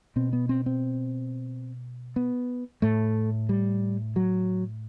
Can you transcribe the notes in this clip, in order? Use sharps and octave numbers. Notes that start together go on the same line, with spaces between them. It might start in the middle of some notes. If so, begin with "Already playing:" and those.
B2 C4
B3
C4
C4
B3
A2 A3
G3
F#3